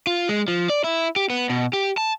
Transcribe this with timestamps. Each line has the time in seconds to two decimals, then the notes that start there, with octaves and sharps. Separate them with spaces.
0.07 F4
0.29 G#3
0.48 F3
0.69 D5
0.84 E4
1.16 G4
1.30 B3
1.50 B2
1.73 G4
1.98 A5